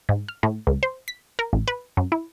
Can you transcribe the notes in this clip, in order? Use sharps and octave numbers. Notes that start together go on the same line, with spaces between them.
G#2
F6
A2
C#2
C5
B6
A#4
A1
B4
F#2
E4